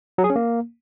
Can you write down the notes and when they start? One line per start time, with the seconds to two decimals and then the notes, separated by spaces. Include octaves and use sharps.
0.18 F#3
0.24 G#4
0.30 C#4
0.36 A#3